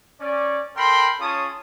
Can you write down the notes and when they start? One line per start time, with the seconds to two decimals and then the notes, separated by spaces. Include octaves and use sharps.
0.20 C#4 D5
0.77 A4 A#4 G5 B5 C6
1.20 C#4 F4 G#4 C#5 A5 D#6